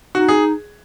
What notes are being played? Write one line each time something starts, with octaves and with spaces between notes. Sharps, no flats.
D#4 F#4
G#4